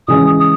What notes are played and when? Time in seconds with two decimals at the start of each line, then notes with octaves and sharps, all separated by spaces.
0.08 C#3 E3 G#3 C#4 D#6
0.39 D#6